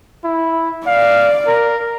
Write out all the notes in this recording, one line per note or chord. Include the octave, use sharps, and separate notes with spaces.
E4
D5 F5
A#4